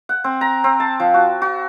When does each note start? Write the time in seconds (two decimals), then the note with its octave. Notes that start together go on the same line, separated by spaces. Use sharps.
0.09 F#5
0.24 C4
0.41 A#5
0.64 C4
0.80 A5
1.00 F3
1.14 F#4
1.42 F#4